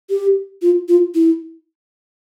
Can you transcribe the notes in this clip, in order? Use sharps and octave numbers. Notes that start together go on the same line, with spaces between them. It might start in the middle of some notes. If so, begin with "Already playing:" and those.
G4
F4
F4
E4